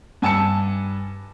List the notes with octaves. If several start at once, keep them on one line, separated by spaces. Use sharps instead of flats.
G2 G#5 A5 E6 C#7